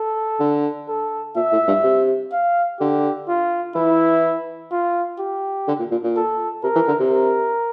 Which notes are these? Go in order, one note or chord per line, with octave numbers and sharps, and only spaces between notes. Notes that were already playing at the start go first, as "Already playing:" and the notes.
Already playing: A4
D3
A4
A#2 E5
A2
G2
C3
F5
D3 G4
F4
E3 E4
F4
G4
D3
A#2
A#2
A#2
A4
C3 A#4
E3
D3
C3
A#4